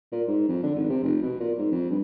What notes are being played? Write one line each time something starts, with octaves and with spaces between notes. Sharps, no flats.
A#2
G#2
F2
D3
G#1
C3
F1
B2
A#2
G#2
F2
G2